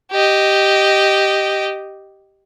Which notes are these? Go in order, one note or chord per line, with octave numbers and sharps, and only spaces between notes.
G4 D#5